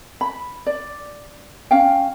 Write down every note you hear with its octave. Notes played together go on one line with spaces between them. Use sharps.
B5
D5
C#4 F5 G5